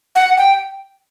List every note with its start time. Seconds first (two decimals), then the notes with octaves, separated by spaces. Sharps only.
0.15 F#5
0.38 G5